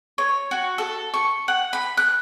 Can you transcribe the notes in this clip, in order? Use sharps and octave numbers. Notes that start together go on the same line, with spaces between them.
C#5
F#4
A4
C#6
F#5
B5
F#6